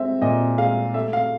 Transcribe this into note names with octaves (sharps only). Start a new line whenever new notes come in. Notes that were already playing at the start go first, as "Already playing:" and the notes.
Already playing: G#3 C4 E5
A#2 D#5
G#3 F5
A3 E5
F5